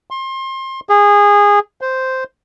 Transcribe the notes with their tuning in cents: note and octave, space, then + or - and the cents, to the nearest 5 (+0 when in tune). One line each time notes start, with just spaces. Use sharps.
C6 +30
G#4 -20
C5 -5